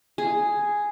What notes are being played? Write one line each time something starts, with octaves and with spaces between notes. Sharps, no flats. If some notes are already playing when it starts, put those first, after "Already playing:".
G#4